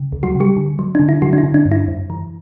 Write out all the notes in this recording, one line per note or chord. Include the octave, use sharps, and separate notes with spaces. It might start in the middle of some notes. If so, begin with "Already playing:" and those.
Already playing: C#3
D2
F#3 F#4
C#3
G3 G4
D3
F#3
D3 D4
E4
D3 F#3 F#4
D4
E4
D3
D4
G2
E4
F#2
E3